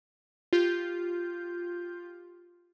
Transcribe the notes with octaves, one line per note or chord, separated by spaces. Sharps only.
F4 G4 G6